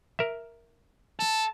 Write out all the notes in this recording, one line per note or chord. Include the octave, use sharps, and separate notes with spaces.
A#4 E5
A4 A5